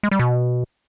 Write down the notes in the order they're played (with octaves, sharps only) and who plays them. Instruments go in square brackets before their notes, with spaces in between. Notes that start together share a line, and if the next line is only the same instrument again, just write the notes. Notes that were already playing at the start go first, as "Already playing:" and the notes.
[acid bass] G#3
G3
B2